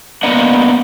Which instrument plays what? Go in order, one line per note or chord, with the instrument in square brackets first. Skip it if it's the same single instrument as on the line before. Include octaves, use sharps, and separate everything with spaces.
[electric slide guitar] A#3 B3 D4 D#5 F#5